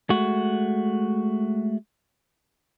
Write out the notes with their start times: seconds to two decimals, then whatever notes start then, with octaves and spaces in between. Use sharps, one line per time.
0.10 G#3 A3 F#4